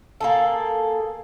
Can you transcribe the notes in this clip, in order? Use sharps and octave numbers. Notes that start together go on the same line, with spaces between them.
A#3 G#4 A4